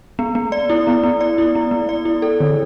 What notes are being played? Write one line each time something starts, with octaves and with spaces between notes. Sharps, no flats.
B3
B3
D5
E4
B3
B3
D5
E4
B3
B3
D5
E4
A4
D3